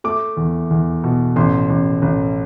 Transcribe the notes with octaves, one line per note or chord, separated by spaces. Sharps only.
A3 D6
E2
E2
B2
A1 C6
A1
A1